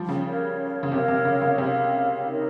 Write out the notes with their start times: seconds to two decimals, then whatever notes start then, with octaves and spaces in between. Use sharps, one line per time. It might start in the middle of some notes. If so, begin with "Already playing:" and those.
Already playing: F3 G3
0.09 C#3
0.25 A#4 C#5 F5
0.83 C#3
0.91 C3 A#4 C#5 F5
1.08 C3
1.25 C#3
1.41 C#3
1.58 C3 A#4 C#5 F5
2.25 D#4 A#4 C#5